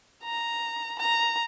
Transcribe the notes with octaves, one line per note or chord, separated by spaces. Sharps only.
A#5
A#5